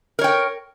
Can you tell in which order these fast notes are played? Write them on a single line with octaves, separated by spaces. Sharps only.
A#4 C#5 G5